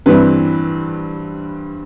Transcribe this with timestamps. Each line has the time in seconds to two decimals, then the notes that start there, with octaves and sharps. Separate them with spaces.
0.06 G2 E3 G3 C4 E4 B4